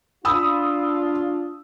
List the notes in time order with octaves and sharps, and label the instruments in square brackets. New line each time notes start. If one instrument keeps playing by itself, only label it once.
[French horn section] D4 F4 [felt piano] B5 D#6 E6